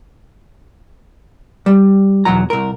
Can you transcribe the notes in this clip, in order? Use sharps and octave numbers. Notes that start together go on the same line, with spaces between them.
G3
B1 E2 F#3 A#5
C2 A#4